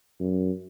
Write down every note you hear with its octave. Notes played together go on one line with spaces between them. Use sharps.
F#2